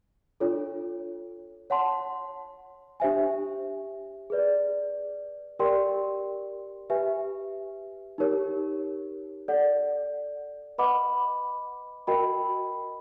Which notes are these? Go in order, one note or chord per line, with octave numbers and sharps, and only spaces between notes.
D4 F4 A4 C#5
C#5 F#5 A5 C6
D4 G4 C5 E5 G#5
G#4 B4 D5
G4 A#4 D5 G5 C6
G4 B4 E5 G#5
D#4 G4 A#4 C#5
A4 D5 F#5
B4 D#5 F#5 B5 D6
F#4 A#4 D#5 G5 B5